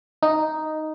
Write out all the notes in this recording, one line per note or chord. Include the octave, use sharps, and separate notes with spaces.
D#4